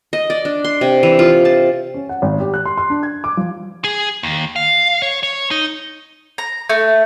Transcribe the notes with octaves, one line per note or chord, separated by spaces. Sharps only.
D#5
D5
D4
C6
C3
E3
F4
A5
C#4
F#5
G#1
G4
F#6
C6
C6
D4
G#6
D6
F3
G#4
D#2
F5
C#5
C#5
D#4
A#5
A3